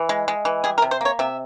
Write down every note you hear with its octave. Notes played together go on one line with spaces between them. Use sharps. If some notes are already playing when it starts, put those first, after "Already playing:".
Already playing: E3
G#3
G#3
E3
G3 G#4
A#4
C3
C5
A#3 C#5
C3 E5